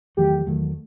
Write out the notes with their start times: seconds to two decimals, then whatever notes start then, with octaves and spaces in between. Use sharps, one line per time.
0.17 E2 D#3 F#3 A3 G4
0.47 E2 D#3 F#3 A3